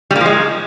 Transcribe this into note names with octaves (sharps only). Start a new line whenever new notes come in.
G3
A#3
F3
G#3